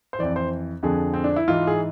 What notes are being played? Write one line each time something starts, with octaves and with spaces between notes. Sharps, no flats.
C5
F2 E3 D5
C5
F2 D3 F3 G#4
C4
D4
E4
G#2 E3 F4
G#4